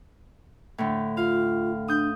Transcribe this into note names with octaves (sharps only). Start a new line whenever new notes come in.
A2 D3
F4 F5
D4 D#6 G6